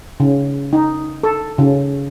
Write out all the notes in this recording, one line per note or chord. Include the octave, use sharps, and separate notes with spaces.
C#3
D#4
A4
C#3